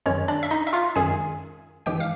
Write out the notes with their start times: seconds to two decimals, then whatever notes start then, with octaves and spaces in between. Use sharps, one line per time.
0.06 F#2 D#3 G#3 C#4 C#5
0.28 D4 D5
0.43 E5
0.51 D#4 D#5
0.67 E5
0.73 F4 F5
0.96 F#2 D#3 G#3 G#4 G#5
1.86 G2 E3 G#3 G4 G5
2.00 F5